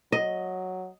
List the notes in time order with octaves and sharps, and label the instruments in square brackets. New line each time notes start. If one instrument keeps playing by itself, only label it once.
[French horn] F#3 [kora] D#5